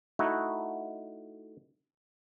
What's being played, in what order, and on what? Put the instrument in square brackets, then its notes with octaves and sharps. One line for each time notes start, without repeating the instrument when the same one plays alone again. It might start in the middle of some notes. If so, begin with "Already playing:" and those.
[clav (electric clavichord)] A3 D#4 E4 F#4